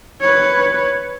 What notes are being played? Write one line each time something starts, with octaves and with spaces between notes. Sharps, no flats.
B4 C#5